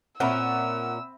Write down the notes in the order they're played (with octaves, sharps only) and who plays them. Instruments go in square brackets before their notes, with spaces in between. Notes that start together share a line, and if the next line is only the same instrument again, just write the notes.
[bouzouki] A#2 C#4 A#4 [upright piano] C4 E5 B5 [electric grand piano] F#5 [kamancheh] E6